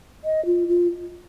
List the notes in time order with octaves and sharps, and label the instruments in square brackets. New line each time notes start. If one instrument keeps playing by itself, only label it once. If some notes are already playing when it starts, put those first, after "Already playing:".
[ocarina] D#5
F4
F4